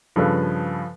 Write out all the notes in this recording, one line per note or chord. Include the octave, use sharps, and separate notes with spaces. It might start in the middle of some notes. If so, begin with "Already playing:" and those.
G2 C#3 F3 A4 B4